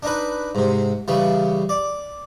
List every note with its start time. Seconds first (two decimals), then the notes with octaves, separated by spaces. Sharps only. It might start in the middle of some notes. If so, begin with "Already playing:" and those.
0.03 D4 D#4 B4
0.55 G#2 C3
1.08 C#3 E3 G3
1.69 D5